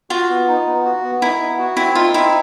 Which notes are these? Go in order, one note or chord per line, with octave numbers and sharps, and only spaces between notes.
F4 F#4
B3
D#4
B3
F#4
B3
D#4 E4
B3
F#4
C4 E4
D#4 F4
C4 E4